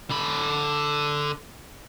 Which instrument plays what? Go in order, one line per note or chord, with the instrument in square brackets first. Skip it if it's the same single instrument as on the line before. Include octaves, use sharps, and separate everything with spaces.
[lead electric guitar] D3 B5